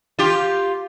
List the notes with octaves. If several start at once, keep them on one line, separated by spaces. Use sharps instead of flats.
F4 G4